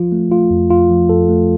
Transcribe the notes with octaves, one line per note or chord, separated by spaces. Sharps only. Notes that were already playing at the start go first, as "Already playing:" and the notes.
Already playing: F3 F4
A3
A3 F4
F2
F2 F4
F3
F2 A4
A3